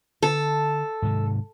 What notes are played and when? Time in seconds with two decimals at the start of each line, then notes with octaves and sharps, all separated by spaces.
0.22 D3 A4
1.02 G#2 C3 D#3